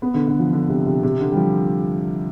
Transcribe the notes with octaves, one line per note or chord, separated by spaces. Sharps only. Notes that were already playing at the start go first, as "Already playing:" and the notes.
B3
D3
D3
F3
D3
C3
C3
C3
D3
G3
F3